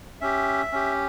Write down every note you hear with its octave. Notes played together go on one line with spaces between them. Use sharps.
C#4 G4 E5
C#4 G4